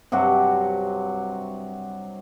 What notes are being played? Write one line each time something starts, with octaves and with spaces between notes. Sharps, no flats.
G2 C3 F#3 F#4